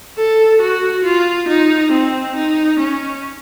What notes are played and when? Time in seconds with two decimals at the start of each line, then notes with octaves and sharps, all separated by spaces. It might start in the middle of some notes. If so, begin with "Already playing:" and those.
0.17 A4
0.61 F#4
1.04 F4
1.48 D#4
1.92 C4
2.35 D#4
2.79 C#4